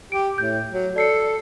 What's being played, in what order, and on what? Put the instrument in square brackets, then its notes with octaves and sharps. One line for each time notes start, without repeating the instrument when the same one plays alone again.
[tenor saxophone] G4 [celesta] D7
[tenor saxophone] A2 [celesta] G6
[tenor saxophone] F#3
[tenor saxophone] A4 [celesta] D5 C7 C#7